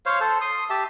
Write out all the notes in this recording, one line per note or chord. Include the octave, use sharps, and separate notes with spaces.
C5 C#5 F5
A4 C5
C6 D#6
G4 E5 A5